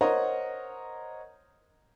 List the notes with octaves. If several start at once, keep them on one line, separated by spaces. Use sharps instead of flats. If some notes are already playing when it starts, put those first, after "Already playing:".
A#4 C5 C#5 D#5 F#5